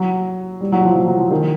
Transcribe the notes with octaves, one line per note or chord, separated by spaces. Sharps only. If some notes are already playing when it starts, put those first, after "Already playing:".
Already playing: F#3
G3
F#3
F3
F#3
F#3
F3
D#3